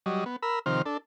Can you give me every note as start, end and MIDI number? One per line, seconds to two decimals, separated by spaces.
0.06 0.24 54
0.06 0.24 55
0.06 0.24 75
0.26 0.36 59
0.42 0.59 70
0.42 0.59 83
0.42 0.59 88
0.66 0.82 48
0.66 0.82 51
0.66 0.82 53
0.66 0.82 72
0.66 0.82 89
0.86 0.97 62
0.86 0.97 69